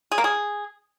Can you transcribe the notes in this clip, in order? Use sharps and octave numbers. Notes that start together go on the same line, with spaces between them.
G#4
A#3
G#4